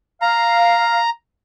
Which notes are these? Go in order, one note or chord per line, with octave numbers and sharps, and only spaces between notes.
F5 A#5